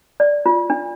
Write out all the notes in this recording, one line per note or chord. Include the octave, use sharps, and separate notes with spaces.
D5
F4
D4